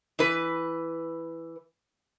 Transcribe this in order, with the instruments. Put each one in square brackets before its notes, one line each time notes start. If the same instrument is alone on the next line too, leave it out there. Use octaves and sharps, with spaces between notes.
[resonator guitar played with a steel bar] E3 B4